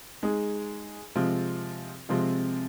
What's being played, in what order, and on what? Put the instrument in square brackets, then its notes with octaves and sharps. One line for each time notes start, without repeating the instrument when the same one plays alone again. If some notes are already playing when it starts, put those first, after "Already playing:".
[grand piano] G#3 D#4 G#4
C3 F3 G#3 C4 F4
C3 F3 G#3 C4 F4